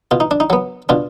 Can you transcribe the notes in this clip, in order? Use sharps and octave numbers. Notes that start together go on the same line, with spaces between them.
B2 F4
D#4
D4
D#4
F#3 B3
B2 D4 F4